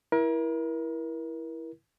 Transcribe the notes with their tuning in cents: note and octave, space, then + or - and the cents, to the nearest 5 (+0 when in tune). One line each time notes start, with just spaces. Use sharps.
E4 +0 A#4 +35